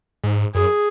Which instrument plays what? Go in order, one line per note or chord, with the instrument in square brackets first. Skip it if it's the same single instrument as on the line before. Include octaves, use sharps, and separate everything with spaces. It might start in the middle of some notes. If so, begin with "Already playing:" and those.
[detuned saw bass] G#2
[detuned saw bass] F#2 [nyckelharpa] G#4